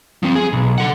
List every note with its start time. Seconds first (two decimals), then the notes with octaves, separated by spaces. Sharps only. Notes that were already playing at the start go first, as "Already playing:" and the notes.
0.23 F3 C4
0.35 G#4
0.53 B1
0.78 A4 F#5